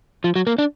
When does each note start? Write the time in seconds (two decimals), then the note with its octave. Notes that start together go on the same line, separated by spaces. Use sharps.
0.24 F3
0.36 F#3
0.47 A#3
0.58 D4